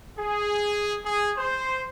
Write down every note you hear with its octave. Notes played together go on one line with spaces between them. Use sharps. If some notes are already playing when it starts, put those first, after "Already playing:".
G#4
G#4
C5